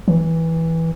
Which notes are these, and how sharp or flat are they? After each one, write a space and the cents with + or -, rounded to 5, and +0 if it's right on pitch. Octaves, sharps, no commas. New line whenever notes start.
E3 -10